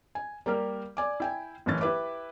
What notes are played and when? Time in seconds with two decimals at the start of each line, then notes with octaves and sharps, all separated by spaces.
0.15 G#5
0.46 G3 A#3 G4 A#4
0.97 D5 G#5 D6
1.20 E4 G5 G#5
1.66 F#1 A2 E3 C#4 A6
1.81 E4 G4 B4 E5 D6